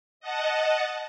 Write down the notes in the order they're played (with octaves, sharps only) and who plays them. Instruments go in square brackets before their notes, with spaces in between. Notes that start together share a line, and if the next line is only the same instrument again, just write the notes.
[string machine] D#5 F#5 A5